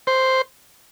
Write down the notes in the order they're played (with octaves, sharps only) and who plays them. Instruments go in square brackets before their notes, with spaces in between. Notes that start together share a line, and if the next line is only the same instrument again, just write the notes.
[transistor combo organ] C5